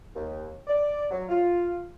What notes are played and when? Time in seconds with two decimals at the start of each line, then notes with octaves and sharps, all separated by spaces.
0.15 D#2
0.67 D5
1.11 F#3
1.29 F4